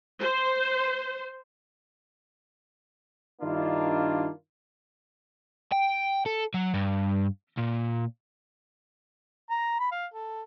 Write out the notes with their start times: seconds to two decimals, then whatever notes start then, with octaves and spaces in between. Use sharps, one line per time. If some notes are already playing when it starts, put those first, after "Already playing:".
0.21 C5
3.42 G2 D#3 A#3 D4 E4 F4
5.72 G5
6.26 A4
6.54 F#3
6.74 G2
7.57 A#2
9.50 A#5
9.80 B5
9.92 F5
10.14 A4